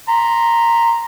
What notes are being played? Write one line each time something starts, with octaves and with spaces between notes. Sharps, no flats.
A#5 C6